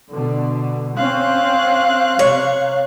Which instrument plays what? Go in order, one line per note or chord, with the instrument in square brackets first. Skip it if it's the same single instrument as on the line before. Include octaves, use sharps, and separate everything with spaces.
[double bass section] B2 D3
[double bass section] C4 C#4 [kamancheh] F5 F#6
[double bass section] C3 [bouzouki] C#5